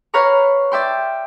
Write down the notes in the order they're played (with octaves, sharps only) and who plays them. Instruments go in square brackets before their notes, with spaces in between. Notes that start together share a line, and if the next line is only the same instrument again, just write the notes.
[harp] B4 C#5 F5 F#5 A#5 C#6
D5 E5 G5 C6